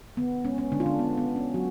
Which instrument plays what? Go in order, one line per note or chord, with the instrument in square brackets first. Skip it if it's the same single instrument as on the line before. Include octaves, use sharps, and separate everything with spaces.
[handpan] D3 B3
G#3 C#4
C#4
D3 G#3 D4
F4
D3 D4
D3 B3
B3
D3
C#4
F#3 G#3 F#4